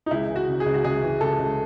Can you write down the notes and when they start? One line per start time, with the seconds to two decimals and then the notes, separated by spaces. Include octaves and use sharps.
0.06 D#4
0.11 C#2 E4
0.29 E3
0.36 F#4
0.48 C#3
0.60 G#4
0.66 C#2
0.74 F#4
0.84 C#2 G#4
1.03 E3
1.21 C#3 A4
1.39 C#2